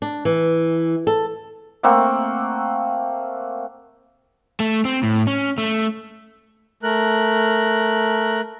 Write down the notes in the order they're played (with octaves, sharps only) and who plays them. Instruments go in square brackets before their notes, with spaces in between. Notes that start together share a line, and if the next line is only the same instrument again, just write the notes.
[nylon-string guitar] D4
E3
A4
[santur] A3 A#3 C4 F#5
[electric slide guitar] A3
C4
A2
C#4
A3
[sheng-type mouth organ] A3 A#4 F#6